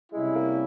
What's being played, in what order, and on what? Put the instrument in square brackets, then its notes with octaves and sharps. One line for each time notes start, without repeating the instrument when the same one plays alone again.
[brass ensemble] C3 G3 C#4 E4 [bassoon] G#3
[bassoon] A#3